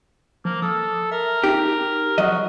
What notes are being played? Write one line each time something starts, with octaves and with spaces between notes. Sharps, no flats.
F3 A#3
A4 D#6
A#4 E5
D#4 G4
F3 F#3 F#4 D#5